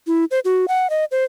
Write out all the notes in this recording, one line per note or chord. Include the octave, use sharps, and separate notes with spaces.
E4
C5
F#4
F#5
D#5
C5